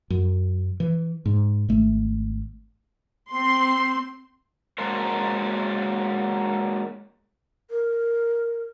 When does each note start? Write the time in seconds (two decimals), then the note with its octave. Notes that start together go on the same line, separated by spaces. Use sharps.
0.10 F#2
0.80 E3
1.26 G#2
1.69 G#1 A3
3.32 C4 C6
4.78 F#3 G#3 A#3 D4 A#4 C5
7.70 A#4